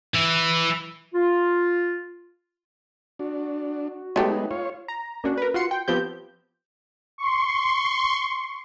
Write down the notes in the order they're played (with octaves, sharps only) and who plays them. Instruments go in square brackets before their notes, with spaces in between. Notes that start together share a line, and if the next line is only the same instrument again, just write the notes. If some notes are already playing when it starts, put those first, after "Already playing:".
[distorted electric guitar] E3 E4
[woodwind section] F4
[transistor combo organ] D4 [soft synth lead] F#4
[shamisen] F#3 A3 G4 [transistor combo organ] G#3 B3 D#4
[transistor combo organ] F4 C#5
[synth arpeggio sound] A#5
A#3 C#4 D4 F#4
A#4 B4
F4 F#4 C6 C#7
G5
F3 B3 C4 G4 G6
[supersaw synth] C6 C#6